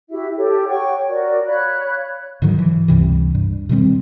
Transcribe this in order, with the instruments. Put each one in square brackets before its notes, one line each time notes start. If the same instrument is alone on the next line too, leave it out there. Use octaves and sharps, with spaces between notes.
[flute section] E4 F#4 G4 E5
G4 A4 C#5
C#5 F#5 G5 C#6
F#4 A#4 D5
C#5 F5 B5 F#6
[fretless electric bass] G#2 D3 D#3 F#3
E3
C#2 G2 C3 E3
G2
B2 D#3 G3 C4